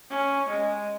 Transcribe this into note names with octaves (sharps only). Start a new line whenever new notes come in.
C#4
G#3